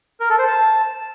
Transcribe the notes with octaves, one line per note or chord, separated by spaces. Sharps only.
A#4
A4
C5
A5